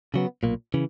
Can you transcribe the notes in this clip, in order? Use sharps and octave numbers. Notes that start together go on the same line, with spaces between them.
C#3 F#3 B3
B1 A#2 A#3
C#3 E3